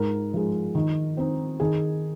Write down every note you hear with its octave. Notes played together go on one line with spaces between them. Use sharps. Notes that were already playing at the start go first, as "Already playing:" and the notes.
Already playing: G#2 A#4
F3 G#3
D#3
C4 D#4
D#3 G#4